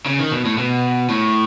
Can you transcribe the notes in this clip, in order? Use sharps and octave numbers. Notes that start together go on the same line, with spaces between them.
C#3
D#3
B2
A2
B2
A2